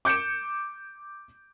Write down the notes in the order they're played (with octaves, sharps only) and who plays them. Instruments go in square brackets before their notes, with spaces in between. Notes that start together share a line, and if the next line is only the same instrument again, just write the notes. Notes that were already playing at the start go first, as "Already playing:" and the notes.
[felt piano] D6 G6 C#7 D7 E7